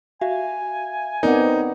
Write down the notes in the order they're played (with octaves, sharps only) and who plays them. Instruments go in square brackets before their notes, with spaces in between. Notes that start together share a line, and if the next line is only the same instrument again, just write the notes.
[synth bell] F#4 E5 F5 [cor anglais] G#5
[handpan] B3 C4 D5 [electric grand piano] D#4 [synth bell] A#4 F#5